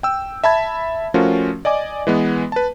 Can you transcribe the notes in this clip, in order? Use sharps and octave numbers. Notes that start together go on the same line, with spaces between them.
G5 E6
E5 A5 B5 G#6
F3 A3 C#4 F4 F#4 A#4
D5 D#5 G#5 D6
E3 G#3 B3
B4 A5